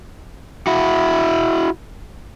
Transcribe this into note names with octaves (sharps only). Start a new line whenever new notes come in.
E4 F#4